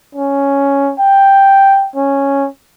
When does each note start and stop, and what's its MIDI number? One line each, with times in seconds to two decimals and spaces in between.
0.15 0.93 61
0.99 1.88 79
1.96 2.48 61